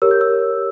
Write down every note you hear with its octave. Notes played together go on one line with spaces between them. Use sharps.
G4 A#4 C#5 E6
G6
E6